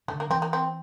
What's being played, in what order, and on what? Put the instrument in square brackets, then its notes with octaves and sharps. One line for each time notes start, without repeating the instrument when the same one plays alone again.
[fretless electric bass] D3 [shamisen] A3
[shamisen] A#3
[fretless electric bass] E3 [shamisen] C4
[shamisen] A#3
C4